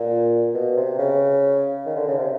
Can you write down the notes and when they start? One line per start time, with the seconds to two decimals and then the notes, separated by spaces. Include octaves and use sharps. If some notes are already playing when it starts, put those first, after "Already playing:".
Already playing: A#2
0.54 B2
0.76 C3
0.98 C#3
1.86 D#3
1.96 D3
2.08 C#3
2.18 C3